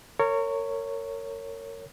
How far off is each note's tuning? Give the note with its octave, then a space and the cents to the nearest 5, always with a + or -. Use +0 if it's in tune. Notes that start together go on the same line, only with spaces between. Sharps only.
A#4 -30 C#5 +0